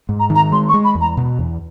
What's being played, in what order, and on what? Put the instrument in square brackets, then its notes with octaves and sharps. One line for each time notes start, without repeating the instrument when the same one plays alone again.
[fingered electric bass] G#2
[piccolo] A#5
[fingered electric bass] D#3
[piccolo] A#5
[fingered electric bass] G#3 [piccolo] C6
[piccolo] C#6
[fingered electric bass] G#3
[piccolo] B5
[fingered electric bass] E2
[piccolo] A#5
[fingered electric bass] B2
E2